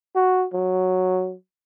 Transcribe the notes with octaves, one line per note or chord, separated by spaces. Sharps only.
F#4
F#3